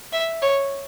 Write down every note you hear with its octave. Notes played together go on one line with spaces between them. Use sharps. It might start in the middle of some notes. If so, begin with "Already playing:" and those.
E5
C#5